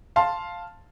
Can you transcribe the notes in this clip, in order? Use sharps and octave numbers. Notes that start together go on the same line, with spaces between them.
F5 A5 C6